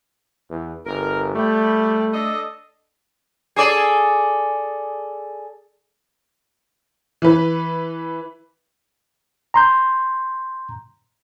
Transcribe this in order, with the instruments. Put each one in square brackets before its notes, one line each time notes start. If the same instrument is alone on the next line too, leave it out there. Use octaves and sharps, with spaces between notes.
[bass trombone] E2
[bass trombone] G1 [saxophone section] A#4
[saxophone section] G3 [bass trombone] A3
[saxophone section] D4 A4 D#5
[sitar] G#4 A4 D5
[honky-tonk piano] E3 B4
[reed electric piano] A#5 C6 G6